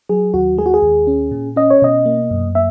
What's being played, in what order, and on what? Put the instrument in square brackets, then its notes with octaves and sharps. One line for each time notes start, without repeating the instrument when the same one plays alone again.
[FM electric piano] F#3 G#4
D#2 F#4
G#3 G#4
F#4
G#4
D#2
C#4
A#2
C#4 D#5
C#5
B2 D#5
A#3
F#2
A#3 E5